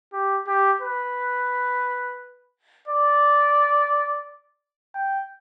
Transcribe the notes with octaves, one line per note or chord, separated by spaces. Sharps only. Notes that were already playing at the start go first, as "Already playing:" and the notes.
G4
G4
B4
D5
G5